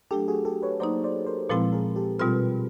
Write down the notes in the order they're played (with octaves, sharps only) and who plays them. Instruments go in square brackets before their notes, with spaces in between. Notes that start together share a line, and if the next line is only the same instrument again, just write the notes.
[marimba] F#3 A3 D4 [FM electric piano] G4 A4
[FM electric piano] F#4 G#4
G4 A4
B4 C#5
[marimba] F#3 A#3 D#4 [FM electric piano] C5 D5
[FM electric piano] C5 D5
A#4 C5
[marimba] A#2 F3 G#3 C4 E4 [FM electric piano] A4 B4
[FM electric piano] G#4 A#4
G4 A4
[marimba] B2 G3 C4 F4 [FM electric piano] A4 B4